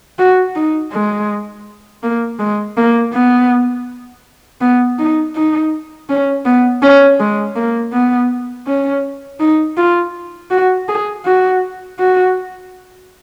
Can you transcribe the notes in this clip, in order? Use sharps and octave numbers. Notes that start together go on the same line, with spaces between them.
F#4
D#4
G#3
A#3
G#3
A#3
B3
B3
D#4
D#4
C#4
B3
C#4
G#3
A#3
B3
C#4
D#4
F4
F#4
G#4
F#4
F#4